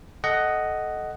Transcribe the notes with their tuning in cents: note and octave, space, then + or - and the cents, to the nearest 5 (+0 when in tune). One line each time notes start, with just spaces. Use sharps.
A4 -10 D#5 +0 F#5 +10